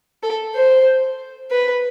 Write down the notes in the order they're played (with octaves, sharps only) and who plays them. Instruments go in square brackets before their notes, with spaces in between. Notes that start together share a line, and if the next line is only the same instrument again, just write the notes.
[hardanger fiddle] A4
C5
B4